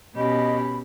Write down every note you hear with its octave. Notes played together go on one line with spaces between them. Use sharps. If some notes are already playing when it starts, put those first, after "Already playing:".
B2 C#4 G4 D#5 B5